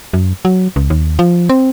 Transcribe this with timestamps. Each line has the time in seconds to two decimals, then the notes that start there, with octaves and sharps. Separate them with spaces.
0.14 F#2
0.45 F#3
0.76 C#2
0.90 D#2
1.19 F3
1.49 C4